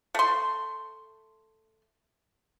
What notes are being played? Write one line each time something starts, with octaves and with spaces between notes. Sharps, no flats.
A3 C6